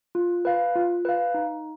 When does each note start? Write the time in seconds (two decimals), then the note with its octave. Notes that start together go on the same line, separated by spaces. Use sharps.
0.15 F4
0.45 B4 F5
0.75 F4
1.05 B4 F5
1.34 D#4